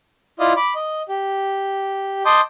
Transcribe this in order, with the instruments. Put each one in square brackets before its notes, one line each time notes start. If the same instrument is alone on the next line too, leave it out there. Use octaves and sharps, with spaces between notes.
[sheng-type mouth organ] E4 F4 D5 D#5 F5 D#6
B5 D6
D#5
G4
D#5 A5 C6 D6 D#6 G6